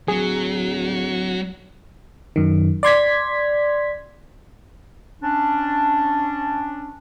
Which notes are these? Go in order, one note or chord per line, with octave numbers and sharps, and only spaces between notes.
D1 F#3 G#4
F#2 D#3
D5 C6 G#6 B6
C#4 D4